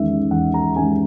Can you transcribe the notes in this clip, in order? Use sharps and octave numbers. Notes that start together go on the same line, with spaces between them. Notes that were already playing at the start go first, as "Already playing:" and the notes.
Already playing: E2 D#3 G#3 C#4 E5
E2 F#5
A#5
D#3 G#3 C#4 G#5